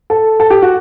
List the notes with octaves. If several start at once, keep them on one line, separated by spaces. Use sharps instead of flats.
A4
A4
G4
F#4